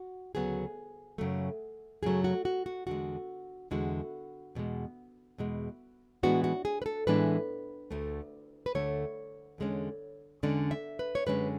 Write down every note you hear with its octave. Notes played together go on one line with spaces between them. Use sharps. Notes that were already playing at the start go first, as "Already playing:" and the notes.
Already playing: F#4
D2 C#3 F#3 B3 G#4
F#2 C#3 F#3 A3
F#2 C#3 F#3 A3 G#4
F#4
F#4
F#4
E2 D3 G#3 F#4
E2 D3 G#3 F#4
E2 B2 G#3
E2 B2 G#3
A2 E3 G#3 B3 D4 F#4
F#4
G#4
B4
A4
A2 E3 G#3 B3 D4 B4
D2 D3 A3
B4
D2 D3 A3 C#5
E2 D3 G#3 C#4
E2 D3 G#3 C#4 D5
E5
B4
C#5
F#2 D3 G#3 C#4 B4